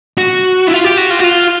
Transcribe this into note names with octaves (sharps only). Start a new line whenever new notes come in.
F#4
E4
F4
G4
F#4
F4
F#4
F4